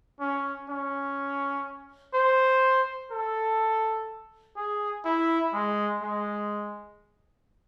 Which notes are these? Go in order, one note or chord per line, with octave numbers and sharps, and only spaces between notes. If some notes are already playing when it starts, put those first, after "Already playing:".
C#4
C#4
C5
A4
G#4
E4
G#3
G#3